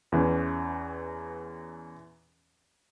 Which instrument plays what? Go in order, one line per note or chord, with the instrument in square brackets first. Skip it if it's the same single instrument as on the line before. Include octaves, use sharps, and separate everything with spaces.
[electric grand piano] E2 E3 C#4